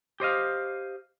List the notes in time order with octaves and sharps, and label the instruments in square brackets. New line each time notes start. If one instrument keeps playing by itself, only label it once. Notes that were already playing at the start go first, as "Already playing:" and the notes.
[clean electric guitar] G4 C5 D#5 F5